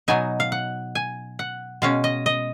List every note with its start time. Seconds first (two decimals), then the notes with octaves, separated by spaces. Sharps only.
0.08 B2 F#3 B3 D#4 G#5
0.40 F5
0.52 F#5
0.95 G#5
1.39 F#5
1.82 B2 G#3 C#4 F5
2.04 D#5
2.26 D#5